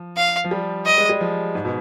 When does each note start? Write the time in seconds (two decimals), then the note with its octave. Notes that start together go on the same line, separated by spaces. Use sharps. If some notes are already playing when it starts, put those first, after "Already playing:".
Already playing: F3
0.17 F5
0.44 F3
0.51 G3
0.86 D#5
0.98 G#3
1.09 G3
1.21 F3
1.55 G#2
1.65 B2